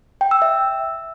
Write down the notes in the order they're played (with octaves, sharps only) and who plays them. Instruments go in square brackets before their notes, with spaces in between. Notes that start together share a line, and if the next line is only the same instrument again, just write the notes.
[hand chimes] G5
E6
E5